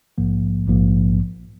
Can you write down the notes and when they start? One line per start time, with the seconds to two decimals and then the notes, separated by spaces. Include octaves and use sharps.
0.18 A#1 G#2 F3 A#3
0.68 A#1 G#2 F3 A#3